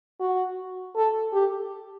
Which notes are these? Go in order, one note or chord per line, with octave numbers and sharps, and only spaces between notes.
F#4
A4
G4